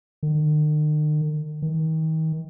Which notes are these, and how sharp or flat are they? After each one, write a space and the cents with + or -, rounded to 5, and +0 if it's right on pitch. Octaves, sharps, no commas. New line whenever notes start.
D#3 -45
D#3 +35